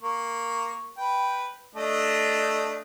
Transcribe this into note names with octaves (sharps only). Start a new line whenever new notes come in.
A#3 C#6
B4 G5
A3 D4 D#5